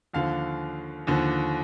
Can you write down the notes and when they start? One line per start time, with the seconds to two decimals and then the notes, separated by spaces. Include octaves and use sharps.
0.13 D#2 D3 F3 F5
1.07 D#2 D3 F3